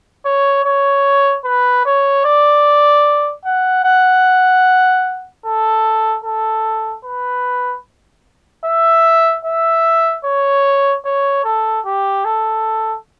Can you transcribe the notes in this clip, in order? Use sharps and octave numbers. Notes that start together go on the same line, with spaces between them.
C#5
C#5
B4
C#5
D5
F#5
F#5
A4
A4
B4
E5
E5
C#5
C#5
A4
G4
A4